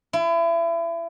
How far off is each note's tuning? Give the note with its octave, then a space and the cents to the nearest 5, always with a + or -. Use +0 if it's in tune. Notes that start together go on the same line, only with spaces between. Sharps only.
E4 +30